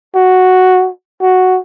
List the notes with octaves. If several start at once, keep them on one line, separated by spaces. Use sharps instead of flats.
F#4
F#4